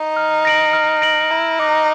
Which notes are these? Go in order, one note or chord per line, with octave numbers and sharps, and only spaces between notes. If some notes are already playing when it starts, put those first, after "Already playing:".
Already playing: D#4
F6
A#6 D7 F#7
F6
A#6 D7 F#7
E4 A#5
D#4 D6 F#6 A#6